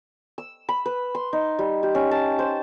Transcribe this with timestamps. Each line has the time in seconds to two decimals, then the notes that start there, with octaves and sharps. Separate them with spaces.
0.38 E6
0.69 B5
0.86 B4
1.15 C6
1.33 D#4
1.59 G3
1.83 G4
1.95 C#4
2.11 A5
2.39 C5